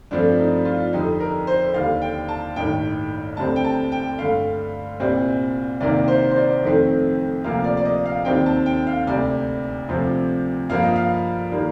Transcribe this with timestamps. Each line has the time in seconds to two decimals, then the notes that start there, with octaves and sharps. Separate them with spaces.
0.11 G2 F3 A3 C4 D4
0.39 D#4
0.65 F4
0.93 F2 D3 G3 D#4
1.20 A#4
1.47 C5
1.74 D#2 D3 G3 F5
2.02 G5
2.29 A5
2.56 A1 G2 D#3 G5
3.37 D2 D3 G3 C4 A5
3.56 G5
3.64 A5
3.92 G5
4.18 G2 D3 A3 F5
5.00 C2 A#2 G3 C4
5.81 C2 C3 D#3 A#3 D5
6.08 C5
6.31 C5
6.36 D5
6.63 F2 D#3 A3 C4
7.44 D2 C3 F3 A#3 F5
7.64 D5
7.77 D5
7.85 D#5
8.06 F5
8.25 D#2 D#3 G3 C4 G5
8.46 A5
8.66 G5
8.87 F5
9.07 D2 C3 G3 D5
9.89 D2 C3 F3 C4
10.70 G2 F3 A#3 F5
10.83 D#5
10.96 F5
11.51 D#3 G3 A#3